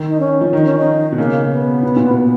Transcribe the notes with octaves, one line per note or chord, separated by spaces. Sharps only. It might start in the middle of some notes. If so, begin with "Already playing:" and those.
Already playing: D#3
D#4
C#4
F3
D#3 D#4
C#4
D#4
B2
C#3 A#3
B3
B2
A#2
B2